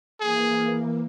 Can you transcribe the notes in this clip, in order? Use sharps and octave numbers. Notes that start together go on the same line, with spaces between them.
E3 A#3 G#4